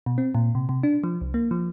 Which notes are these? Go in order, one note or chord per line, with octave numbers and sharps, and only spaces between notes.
B2
C4
A#2
C3
C3
D4
F3
C2
A#3
F3